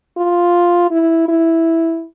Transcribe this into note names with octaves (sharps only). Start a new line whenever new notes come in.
F4
E4
E4